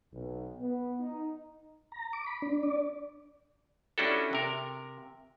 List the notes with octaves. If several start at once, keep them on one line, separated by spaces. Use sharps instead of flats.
B1
B3
D#4
A#5
D6
B5
D4
D5
G3 C#4 D4 E4 F#4 A4
C3 A#4